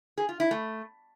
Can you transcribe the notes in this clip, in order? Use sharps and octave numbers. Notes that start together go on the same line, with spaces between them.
G#4
F4
E4
A3